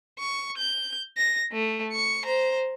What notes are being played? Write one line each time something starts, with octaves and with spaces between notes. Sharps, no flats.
C#6
G6
A#6
A3
C#6 C#7
C5 A#5